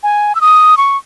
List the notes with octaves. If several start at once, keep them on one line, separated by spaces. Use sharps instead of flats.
G#5
E6
D#6
C#6